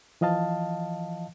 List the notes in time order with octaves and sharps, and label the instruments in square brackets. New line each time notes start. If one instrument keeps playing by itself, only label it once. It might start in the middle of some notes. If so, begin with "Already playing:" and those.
[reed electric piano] E3 F3 D#5 F5 A5